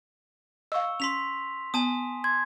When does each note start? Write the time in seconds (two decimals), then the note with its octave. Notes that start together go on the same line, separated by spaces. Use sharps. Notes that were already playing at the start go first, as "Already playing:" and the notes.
0.72 D#5 F5 C#6 E6
1.00 C#4 C6 B6 F7
1.74 B3 G#5 A5 D#6
2.24 C6 G#6